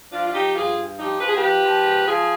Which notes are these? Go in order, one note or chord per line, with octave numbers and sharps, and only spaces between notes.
F3 D4 F4
F4
F3 D#4 G4
G2 F4 G#4
G2
F3 D#4 G4
F3 B4
G#4
G4 B4
F3
F3
G#2
F3 F4 G#4